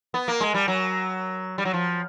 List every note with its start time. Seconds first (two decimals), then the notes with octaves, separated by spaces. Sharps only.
0.14 B3
0.28 A#3
0.41 G#3
0.54 G3
0.68 F#3
1.58 G3
1.65 F#3
1.74 F3